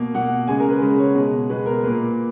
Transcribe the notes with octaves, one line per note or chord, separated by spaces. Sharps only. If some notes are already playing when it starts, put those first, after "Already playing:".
Already playing: B2 A#3
B2 A#3 F#5
C#3 G#3 G#5
A#4
B4
C#3 G#3 B4
C#5
B2 G#3
B2 G#3 B4
A#4
A#2 A#3 B4